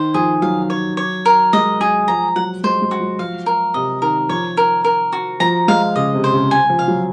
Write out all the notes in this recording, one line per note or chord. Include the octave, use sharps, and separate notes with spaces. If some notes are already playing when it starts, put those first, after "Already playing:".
Already playing: D#3 C5
F3 G#4
F#3 F5
C#5
C#5
A#4
G#3 D#5
F#3 G#4
F3 A#5
F#3 F#5
G#3 C5
G#3
F#4
F#3
F3 F5
A#4
C3 D#5
D#3 A#4
F3 C#5
A#4
A#4
F#4
F3 A#5
G#3 F5
C#3 D#5
C3
C5
C#3
G#5
F3
F5
F#3